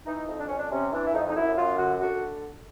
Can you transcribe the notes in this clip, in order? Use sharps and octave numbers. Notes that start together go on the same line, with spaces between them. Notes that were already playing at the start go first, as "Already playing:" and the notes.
E3 D#4
F2
D4
F2 C#4
D4
C3 C#4
E3 D4
E4
F2 D#4
D#4
F#2 E4
F#2 F4
D3 F#4
D3 F#4